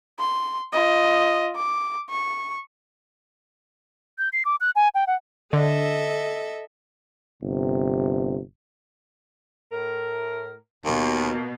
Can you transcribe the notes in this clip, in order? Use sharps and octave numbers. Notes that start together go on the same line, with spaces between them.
C6
F4 D#5
D6
C#6
G6
C7
D6
F#6
G#5
G5
F#5
D3 A4 D#5 E5
G1 C3
A2 A#4
D#2 B2 A#3